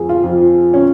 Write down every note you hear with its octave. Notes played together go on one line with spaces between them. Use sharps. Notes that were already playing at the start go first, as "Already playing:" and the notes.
Already playing: F2 F3 G#4
F4
F2 F3
C#4